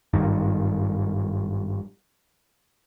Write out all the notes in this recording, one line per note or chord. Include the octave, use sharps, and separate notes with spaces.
G#1 G2 D#3